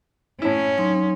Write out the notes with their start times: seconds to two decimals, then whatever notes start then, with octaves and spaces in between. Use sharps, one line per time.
0.42 A2 C#4 E4
0.78 F#3 D#4 C6